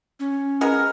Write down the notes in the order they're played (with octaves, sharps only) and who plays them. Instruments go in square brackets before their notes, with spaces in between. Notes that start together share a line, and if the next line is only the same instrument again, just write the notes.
[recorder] C#4
[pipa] G#3 B3 A#4